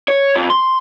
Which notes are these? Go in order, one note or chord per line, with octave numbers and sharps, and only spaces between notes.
C#5
F2
C6